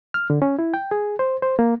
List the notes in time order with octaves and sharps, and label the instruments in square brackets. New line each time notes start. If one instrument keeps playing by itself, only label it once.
[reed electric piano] F6
D3
C#4
E4
G5
G#4
C5
C5
A#3